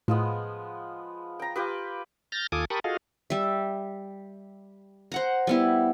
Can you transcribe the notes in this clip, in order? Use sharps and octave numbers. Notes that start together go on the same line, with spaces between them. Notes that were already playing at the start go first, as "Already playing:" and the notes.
A2 F3 G#3 B3
G5 A#5
F4 G4 B4 D#6
F6 G6 A6 A#6
D#2 F4 A4 G#5 D6 D#6
G4 A#4 A5 B5 C#6 D#6
F4 F#4 G#4 A4 D#5 F5
G3 E5
C5 F#5 A#5
G3 B3 E4